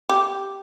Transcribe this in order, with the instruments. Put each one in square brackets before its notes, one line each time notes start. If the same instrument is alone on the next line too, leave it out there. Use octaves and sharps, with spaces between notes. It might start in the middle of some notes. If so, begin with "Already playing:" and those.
[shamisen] G4